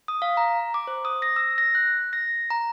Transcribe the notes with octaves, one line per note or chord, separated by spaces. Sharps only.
D#6
F5
A#5
D6
C5
D#6
A#6
E6
A#6
F#6
A#6
A#5